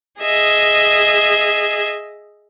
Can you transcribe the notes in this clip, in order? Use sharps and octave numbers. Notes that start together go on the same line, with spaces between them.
G#4 D#5 E5